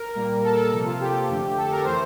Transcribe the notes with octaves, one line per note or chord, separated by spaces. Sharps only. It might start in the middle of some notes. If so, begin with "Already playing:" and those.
Already playing: A#4
A#2 G3 A#3
A4
A4
C3 F3 A#3 A4
F4
G4
F2 D3 A3
A4
A#4
E3 A3 C5